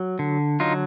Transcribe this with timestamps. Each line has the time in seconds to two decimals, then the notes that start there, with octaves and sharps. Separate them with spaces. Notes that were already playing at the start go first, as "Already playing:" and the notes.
Already playing: F#3
0.19 D3
0.60 F#3 D#4 F4